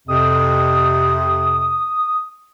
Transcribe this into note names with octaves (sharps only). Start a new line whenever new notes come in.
F2 C3 D#6